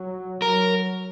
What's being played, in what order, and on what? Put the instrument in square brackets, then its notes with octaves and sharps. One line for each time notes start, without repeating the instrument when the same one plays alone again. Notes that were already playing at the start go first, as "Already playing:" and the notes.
Already playing: [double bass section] F#3
[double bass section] F#3 [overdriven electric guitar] A#4